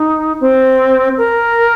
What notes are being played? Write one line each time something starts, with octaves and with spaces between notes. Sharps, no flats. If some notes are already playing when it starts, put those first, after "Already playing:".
Already playing: D#4
C4
A#4